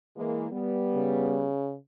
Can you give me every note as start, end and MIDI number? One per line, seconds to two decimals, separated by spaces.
0.16 0.46 52
0.16 0.46 56
0.16 0.46 58
0.51 1.49 55
0.51 1.49 59
0.96 1.76 49